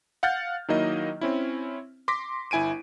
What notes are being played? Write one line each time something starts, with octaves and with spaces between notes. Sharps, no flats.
F5 F#5 F6 G6 A6
D#3 F#3 A#3 D#4 E4 D#5
C4 C#4 E4
C6 D6 A#6 B6
G1 E4 G#5 D7 D#7